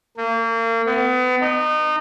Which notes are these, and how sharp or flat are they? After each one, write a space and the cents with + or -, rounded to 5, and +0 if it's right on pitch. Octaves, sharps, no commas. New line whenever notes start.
A#3 -35
B3 +35
D#4 -25